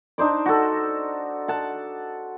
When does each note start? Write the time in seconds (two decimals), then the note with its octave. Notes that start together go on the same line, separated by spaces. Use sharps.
0.18 D4 D#4 C5 D5
0.46 F#4 A4
1.48 F#5 A5